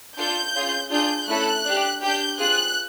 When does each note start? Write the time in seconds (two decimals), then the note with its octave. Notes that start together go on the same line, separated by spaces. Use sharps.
0.17 D4 F4 A4 G6
0.54 C#4 F4 G#4
0.91 D4 F4 G#4 G6
1.28 A3 C#4 E4 A4 F#6
1.65 D4
1.70 G4
2.03 D4 G4 G6
2.39 C4 F4 G#4 F#6